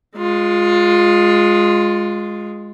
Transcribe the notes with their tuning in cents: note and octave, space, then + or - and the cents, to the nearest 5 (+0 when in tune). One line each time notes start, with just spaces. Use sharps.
G#3 +0 F4 +15